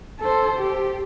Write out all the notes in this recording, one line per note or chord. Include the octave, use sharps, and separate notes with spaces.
A4 C5
G4